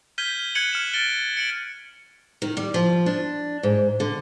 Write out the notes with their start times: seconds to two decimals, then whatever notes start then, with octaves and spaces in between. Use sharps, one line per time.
0.18 F6 G6 G#6 B6 D#7 G7
0.39 G7
0.55 F#6 G#6 C#7 D#7 F#7
0.73 F6 C#7 E7
0.93 A6 D7 G7
1.37 C#7 D7 F#7
2.42 D#3
2.57 G3
2.74 F3
3.06 D4
3.63 G#2
4.00 D3